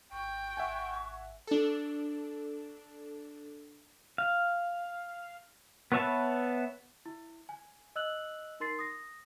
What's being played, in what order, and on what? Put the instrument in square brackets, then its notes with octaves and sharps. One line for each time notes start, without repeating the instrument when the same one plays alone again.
[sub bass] G#1 [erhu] G5 [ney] C#6
[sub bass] G#1 [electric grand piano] E5 F#5 G#5
[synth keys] D4 A4
[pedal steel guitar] F5
B3 B4 C#5 E5 A5
[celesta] E4
G#5
D#5 E6 F#6 F#7
D#4 A#4 C6 A6 C7
D#6 A#6